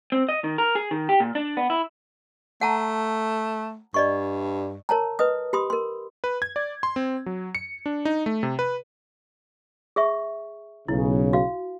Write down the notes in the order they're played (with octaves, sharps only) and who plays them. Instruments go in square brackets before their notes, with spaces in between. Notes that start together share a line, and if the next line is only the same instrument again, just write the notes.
[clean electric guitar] C4
D#5
D#3
A#4
G#4
D#3
G4
A#2
D4
B3
E4
[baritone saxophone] A3 [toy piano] F#5 A5 A#5
[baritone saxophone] G2 [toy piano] D5 D#5 C#6
[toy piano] A#4 C#5 A5 A#5
B4 D#5 D#6
G4 B5 C6 D#6
A#4 C6
[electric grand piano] B4
G#6
D5
C6
C4
F#3
C#7
D4
D#4
A3
C3
B4
[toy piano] G#4 E5 C#6
[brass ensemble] B1 C#3 [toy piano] E4
[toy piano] F#4 F5